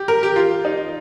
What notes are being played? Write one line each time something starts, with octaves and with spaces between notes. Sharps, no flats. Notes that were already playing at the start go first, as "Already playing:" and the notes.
Already playing: G4
A#4
G4
F4
D#4